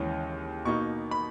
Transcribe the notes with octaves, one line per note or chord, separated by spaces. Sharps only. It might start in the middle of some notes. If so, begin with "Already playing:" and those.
Already playing: D#2 C#3 E3 G#3 C#4
B2 A#3 D#4 C#6
B5